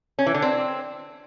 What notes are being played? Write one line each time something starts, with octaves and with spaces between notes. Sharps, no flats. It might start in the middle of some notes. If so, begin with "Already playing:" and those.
C#4
E3
D3
C4